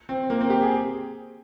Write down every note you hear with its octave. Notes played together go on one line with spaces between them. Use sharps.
C4
A#3
C4
G4
G#4